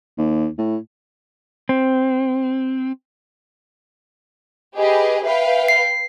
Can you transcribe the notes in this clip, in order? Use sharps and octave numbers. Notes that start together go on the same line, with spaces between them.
D#2
A2
C4
G4 G#4 B4 D#5
B4 E5 F5 G5
C7